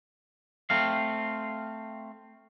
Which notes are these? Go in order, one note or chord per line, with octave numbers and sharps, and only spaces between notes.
A3 C4 F5